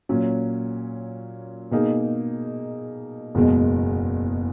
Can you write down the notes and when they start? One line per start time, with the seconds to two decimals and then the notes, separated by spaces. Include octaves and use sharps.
0.09 A#2 F#3 C#4
1.71 B2 A#3 D#4 G#4
3.35 F#1 E2 B2 G#3